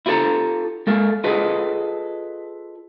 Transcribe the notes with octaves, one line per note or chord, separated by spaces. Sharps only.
E4 F4 G4 A4 A5 A#5
G#3 A4 A#4
F4 G#4 A4 B4 D#5